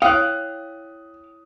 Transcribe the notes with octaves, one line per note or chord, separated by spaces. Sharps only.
E4 C#5 F5 G5 D#6 F#6